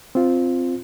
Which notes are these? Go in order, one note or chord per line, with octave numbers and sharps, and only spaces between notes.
C4 F4